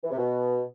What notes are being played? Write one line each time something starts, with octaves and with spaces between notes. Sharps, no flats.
E3
C3
B2